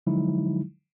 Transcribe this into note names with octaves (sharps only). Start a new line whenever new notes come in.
D3 F3 F#3 G#3 D#4 E4